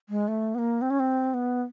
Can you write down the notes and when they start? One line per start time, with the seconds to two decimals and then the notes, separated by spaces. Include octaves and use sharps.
0.09 G#3
0.28 A3
0.55 B3
0.58 A#3
0.82 C4
0.90 C#4
1.00 C4
1.34 B3